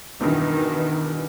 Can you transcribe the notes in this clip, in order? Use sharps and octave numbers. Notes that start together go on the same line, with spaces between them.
E2 G2 B2 D#3